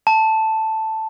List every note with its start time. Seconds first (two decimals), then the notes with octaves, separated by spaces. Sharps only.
0.07 A5